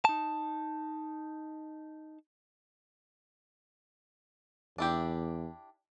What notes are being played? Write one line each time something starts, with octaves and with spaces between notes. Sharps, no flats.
D#4 A5
E2 D4 E4 G4